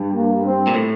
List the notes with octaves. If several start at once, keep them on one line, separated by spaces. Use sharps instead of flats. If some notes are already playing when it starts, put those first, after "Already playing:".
Already playing: G2
A#3
C4
A#2
A2